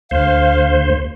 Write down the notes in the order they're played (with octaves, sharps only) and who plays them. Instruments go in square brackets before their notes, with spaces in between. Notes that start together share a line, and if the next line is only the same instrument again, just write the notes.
[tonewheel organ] D2 C5 [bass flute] F5